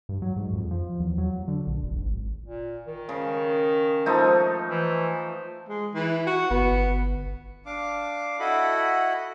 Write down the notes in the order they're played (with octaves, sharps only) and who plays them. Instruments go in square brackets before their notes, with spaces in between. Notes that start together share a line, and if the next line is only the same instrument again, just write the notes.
[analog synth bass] G2
F#3
G#2
F2
F3
E2
F#3
D3
A#1
E1
G#1
[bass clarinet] A#2
D#3
[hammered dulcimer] C#3
F3 A3 D#4
[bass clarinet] E3
[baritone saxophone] G#3
E3
F#4
[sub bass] G1 [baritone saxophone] B3
[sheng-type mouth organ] D4 F5 D6
E4 F#4 A4 D#5 F#5 B5